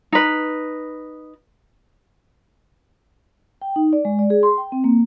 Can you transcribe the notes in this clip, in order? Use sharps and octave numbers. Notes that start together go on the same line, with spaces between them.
D#4 B4
G5
D#4
D5
G#3
D5
G#4
C6
G5
C4
A#3